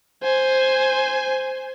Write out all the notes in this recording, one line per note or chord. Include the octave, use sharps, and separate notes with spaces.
C5 G#5